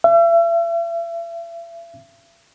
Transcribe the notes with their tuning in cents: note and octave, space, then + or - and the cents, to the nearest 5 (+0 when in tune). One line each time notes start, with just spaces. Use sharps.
E5 +40